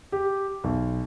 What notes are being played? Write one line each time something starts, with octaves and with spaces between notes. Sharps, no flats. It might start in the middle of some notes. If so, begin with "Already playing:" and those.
G4
B1